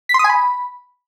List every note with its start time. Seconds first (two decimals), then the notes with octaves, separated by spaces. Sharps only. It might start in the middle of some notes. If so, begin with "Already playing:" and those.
0.09 B6
0.14 C6
0.19 D#6
0.24 G#5
0.29 B5